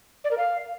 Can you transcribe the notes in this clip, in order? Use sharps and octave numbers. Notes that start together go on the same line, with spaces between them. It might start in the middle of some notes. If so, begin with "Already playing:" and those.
D5
A#4
F5